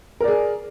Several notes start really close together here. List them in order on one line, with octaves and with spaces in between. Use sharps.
A#4 D5 G#4